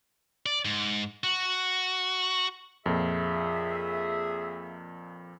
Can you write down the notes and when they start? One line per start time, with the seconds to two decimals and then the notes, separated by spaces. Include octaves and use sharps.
0.46 D5
0.65 G#2
1.24 F#4
2.86 F2 A#2 G#4 E5